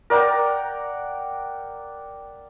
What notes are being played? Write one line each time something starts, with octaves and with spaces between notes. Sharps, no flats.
A#4 D5 F#5 G5